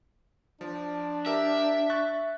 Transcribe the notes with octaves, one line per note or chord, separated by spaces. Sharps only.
F3 D4
G4 A#4 E5
C#6 F#6 A6